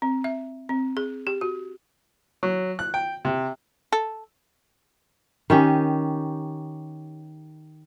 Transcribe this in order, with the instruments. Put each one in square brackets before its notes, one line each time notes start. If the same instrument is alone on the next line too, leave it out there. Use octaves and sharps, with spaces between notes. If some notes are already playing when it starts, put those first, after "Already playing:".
[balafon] C4
E5
C4
G#4
G4
F#4
[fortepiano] F#3
F#6
G5
C3
[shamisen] A4
[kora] D#3 C#4 G4